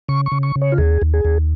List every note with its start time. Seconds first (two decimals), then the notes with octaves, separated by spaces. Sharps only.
0.09 C#3 C#6
0.26 C#6
0.32 C#3
0.43 C#6
0.56 C#3
0.62 C#5
0.72 F4
0.78 D#2 G#4
1.02 D#2
1.14 G#4
1.25 D#2